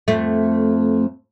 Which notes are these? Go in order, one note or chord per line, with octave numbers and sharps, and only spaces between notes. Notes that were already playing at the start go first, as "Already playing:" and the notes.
F2 A3